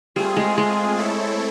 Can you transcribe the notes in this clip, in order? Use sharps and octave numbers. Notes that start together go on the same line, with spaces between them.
G3 A3 C4 F4 G#4
G#3
G#3
A3 C4 E4 A4 C#5